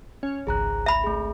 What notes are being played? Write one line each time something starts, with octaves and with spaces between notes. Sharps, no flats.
C#4
G#1 C#2 G#4 A#5 F#6
E5 B5
A3 G#4